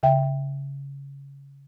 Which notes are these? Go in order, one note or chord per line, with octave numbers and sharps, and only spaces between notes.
C#3 E5 G5